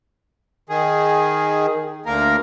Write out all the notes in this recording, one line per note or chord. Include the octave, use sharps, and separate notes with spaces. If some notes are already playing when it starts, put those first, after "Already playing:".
D#3 G#4
D2 A#3 A#4